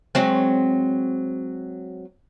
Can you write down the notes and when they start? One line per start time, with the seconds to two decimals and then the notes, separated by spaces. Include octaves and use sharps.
0.15 F#3 G#3 C4